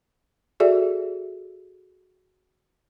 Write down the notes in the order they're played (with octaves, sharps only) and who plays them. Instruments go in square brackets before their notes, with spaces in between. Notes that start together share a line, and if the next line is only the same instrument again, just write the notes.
[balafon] F#4 G#4 A4 D5 E5